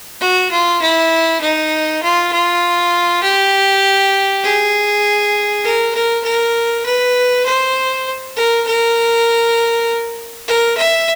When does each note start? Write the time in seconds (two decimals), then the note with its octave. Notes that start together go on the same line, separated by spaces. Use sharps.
0.21 F#4
0.51 F4
0.81 E4
1.41 D#4
2.02 F4
2.32 F4
3.23 G4
4.44 G#4
5.64 A#4
5.95 A#4
6.24 A#4
6.86 B4
7.46 C5
8.36 A#4
8.67 A#4
10.48 A#4
10.77 E5